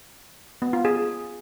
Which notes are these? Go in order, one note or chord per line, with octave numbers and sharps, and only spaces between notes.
B3
F4
G#4